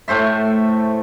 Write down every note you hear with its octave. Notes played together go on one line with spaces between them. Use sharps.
A2 A3 C5 E5